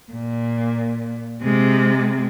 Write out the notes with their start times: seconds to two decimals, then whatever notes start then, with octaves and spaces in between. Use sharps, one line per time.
0.12 A#2
1.41 C3 G#3